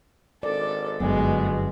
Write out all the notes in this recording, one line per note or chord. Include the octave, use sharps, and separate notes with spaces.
G#1 A4 D5
G1 F#2 B2 G#3 B3